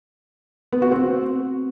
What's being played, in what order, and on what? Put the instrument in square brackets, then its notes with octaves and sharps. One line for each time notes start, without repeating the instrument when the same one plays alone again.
[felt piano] B3
F#4
C4